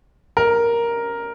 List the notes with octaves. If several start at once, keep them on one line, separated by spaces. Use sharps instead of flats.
A#4